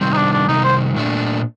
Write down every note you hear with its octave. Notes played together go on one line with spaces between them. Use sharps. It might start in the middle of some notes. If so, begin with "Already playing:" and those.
C3 D#3 G3 C4
D#4
D4
D4
C3 D#3 G3 D#4
C5
A#2 A3 D4